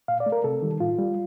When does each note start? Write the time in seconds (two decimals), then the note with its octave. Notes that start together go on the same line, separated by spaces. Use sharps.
0.08 A#2 F5
0.20 D5
0.26 A3
0.32 A#4
0.44 C3 A4
0.62 D#3 G3
0.80 A2 F4
0.99 G3